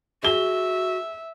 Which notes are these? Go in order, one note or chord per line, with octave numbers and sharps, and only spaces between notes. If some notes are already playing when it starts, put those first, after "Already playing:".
F#4 G#4 E5 G7